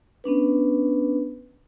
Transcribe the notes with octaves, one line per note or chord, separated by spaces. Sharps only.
B3 C#4 D4 B4